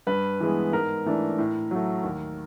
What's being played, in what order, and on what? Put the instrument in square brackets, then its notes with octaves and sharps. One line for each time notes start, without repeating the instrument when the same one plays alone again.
[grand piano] G2 B4
E3 G#3 B3
G#2 A#4
E3 A3 D4
A2
F#3 A3
D#2